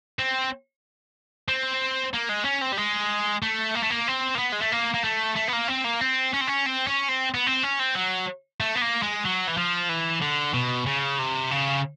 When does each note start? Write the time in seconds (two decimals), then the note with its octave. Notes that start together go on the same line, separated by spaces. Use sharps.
0.19 C4
1.48 C4
2.14 A#3
2.29 G#3
2.45 C#4
2.62 C4
2.73 G3
2.78 G#3
3.42 A3
3.75 A#3
3.83 A3
3.90 A#3
4.08 C4
4.35 A#3
4.39 B3
4.52 G#3
4.61 A3
4.72 A#3
4.94 A#3
5.04 A3
5.36 A3
5.48 B3
5.53 A#3
5.68 C4
5.84 A#3
6.01 C4
6.34 C#4
6.41 C4
6.48 C#4
6.66 C4
6.87 C#4
7.08 C4
7.34 B3
7.47 C4
7.63 C#4
7.80 C4
7.95 F#3
8.60 A3
8.75 B3
8.82 A#3
9.02 G#3
9.25 F#3
9.47 E3
9.57 F3
9.89 E3
10.22 D3
10.54 B2
10.87 C#3
11.19 C3
11.51 C#3